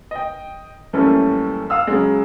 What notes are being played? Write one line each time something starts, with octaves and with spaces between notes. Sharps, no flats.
D#5 G5
F#2 E3 G3 A3 A#3 C#4
F5 D#6 E6
C#3 F#3 G#3